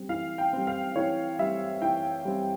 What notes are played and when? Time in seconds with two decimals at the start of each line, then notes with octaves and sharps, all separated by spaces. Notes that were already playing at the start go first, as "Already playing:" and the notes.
Already playing: G3 C4
0.09 E3 F5
0.38 G5
0.53 G3 C4
0.67 F5
0.96 E3 C#5
1.39 G3 C4 E5
1.82 E3 G5
2.25 G3 C4